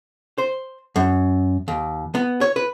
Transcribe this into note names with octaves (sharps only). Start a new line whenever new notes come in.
C5
F#2
D#2
B3
C#5
B4